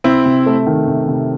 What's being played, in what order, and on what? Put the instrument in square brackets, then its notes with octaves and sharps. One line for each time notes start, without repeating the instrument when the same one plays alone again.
[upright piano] C3 [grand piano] C4 E4
[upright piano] C3
A3
D#3
C3
C3